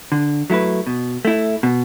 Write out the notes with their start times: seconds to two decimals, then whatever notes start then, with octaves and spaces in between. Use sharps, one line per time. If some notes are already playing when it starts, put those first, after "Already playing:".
0.12 D3
0.50 F#3 A3 E4 B4
0.87 B2
1.25 A3 E4
1.63 B2